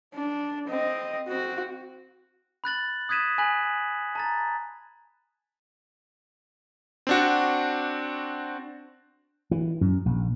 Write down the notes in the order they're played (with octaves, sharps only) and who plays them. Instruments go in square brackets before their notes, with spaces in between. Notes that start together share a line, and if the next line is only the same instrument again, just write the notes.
[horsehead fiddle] D4
C4 D#5
C4 F#4
[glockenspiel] B5 F#6 A6 F#7
D#6 F#6 G#6 B6 D#7 E7
G#5 B5 F#6 B6 F#7
A5 A#5 A6
[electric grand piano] C4 D4 F#4
[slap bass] E3
F#2
A#1